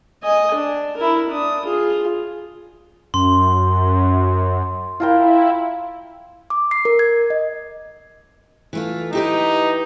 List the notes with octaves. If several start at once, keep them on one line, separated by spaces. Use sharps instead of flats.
D#5 G#5
D4
E4 A#4
D4 D#6
F4 G#4
F#2 C6
E4 F4 A#4 G5
D6
C7
A#4
G#6
D#5
E3 A3 F4
D#4 E4 G4 B4